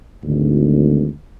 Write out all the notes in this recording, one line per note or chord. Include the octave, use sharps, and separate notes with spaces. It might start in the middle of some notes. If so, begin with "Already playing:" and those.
G#1 D2